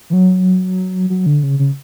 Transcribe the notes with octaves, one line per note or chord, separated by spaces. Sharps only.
E3
F#3
F#3
D3
C#3
C#3